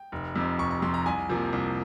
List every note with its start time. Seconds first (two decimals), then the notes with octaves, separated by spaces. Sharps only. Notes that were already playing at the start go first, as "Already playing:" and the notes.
Already playing: G5
0.12 F1
0.36 F2 C3
0.59 F1 C#6
0.71 C#6
0.82 F2 C3 C6
0.94 A#5
1.06 C2 G#5
1.29 C3 F3 A#3
1.53 C2